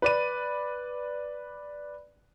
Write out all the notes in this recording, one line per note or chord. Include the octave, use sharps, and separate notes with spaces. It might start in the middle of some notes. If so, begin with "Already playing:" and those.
B4 D5 D#7